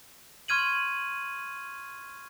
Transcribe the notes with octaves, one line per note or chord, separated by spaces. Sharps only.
C6 C#6 F6 G#6 D#7 F#7